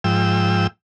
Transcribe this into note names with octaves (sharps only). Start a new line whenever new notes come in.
G#2 F3 G5 E6